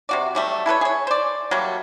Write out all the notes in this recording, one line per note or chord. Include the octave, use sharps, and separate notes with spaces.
C3 F#4 D5
F#3 G3 A3
E4 A4 B4 C#5
G#4 C#5
C5 D5
F#3 G3 A3 A#3